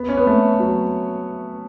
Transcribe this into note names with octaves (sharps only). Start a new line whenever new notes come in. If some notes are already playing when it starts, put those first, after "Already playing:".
Already playing: B3
C#4
B3
A3
F#3